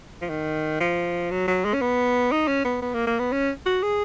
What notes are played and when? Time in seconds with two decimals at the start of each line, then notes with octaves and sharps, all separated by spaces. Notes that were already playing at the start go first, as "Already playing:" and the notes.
0.22 F3
0.29 D#3
0.80 F3
1.31 F#3
1.48 F#3
1.65 G#3
1.73 C#4
1.81 B3
2.32 D#4
2.47 C#4
2.64 B3
2.82 B3
2.94 A#3
3.07 A#3
3.19 B3
3.32 C#4
3.66 F#4
3.83 G#4